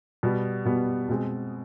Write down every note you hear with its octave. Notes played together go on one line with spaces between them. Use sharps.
B2 G3 B3
B2 G3 B3
B2 G#3 C4